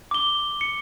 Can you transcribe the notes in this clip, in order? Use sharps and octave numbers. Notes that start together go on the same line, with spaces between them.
D6 G7
C#7